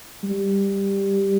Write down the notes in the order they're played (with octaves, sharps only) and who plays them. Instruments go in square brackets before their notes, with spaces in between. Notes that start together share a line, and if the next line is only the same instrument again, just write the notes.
[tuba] G3